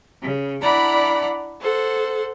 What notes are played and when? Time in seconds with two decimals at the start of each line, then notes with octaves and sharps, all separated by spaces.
0.21 C#3
0.62 D4 E4 D5 F#5 A#5 B5
1.59 A4 C5 F#5